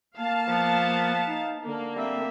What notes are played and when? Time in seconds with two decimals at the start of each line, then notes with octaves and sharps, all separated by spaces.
0.18 A#3 F5 A5
0.48 F3 B3
1.26 D#4
1.66 D3 A#3
1.97 G3 C4 E5